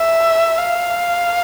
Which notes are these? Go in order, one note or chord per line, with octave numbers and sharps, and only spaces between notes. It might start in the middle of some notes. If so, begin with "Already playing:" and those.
Already playing: E5
F5